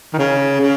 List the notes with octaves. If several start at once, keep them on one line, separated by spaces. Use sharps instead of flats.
D#3
C#3
C#3